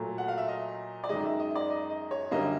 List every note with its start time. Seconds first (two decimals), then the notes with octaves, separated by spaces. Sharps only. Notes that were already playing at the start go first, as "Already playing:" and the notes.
Already playing: A#2 F#3 A3
0.18 F#5
0.28 F5
0.38 E5
0.48 D#5
1.04 D5
1.09 F#2 D#3 G#3 D#5
1.25 E5
1.39 D#5
1.55 D5
1.70 D#5
1.90 D#5
2.11 C#5
2.31 F#2 D3 G3 A#3 D#5